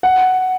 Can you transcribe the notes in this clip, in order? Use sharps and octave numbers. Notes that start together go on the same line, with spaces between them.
F#5